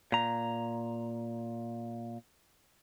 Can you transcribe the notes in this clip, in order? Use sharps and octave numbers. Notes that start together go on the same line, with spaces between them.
A#2 A#5